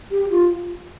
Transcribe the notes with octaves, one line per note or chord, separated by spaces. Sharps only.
G4
F4